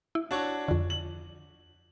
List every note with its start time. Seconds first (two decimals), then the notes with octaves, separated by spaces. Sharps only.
0.15 E4
0.31 D4 F#4 C#5
0.68 F2 D3
0.90 F#7